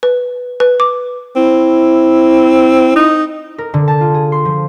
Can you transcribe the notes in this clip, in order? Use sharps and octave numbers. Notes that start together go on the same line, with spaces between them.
B4
B4
D6
C4 E4
D#4
A#4
D3
A5
F4
G#4
C6
F3